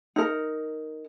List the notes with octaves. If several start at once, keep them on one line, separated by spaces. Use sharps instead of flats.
D#4 A#4